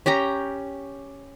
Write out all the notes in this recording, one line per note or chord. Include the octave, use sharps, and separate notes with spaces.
C#4 G4 G5 A#5